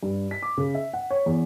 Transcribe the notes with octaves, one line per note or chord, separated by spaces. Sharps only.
G2
B6
D6
C#3
E5
F#5
C#5
E2